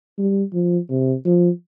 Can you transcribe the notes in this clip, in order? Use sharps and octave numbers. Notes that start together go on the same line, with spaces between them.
G3
F3
C3
F3